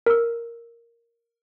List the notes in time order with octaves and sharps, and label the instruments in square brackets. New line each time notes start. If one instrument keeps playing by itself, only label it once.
[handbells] A#4 E6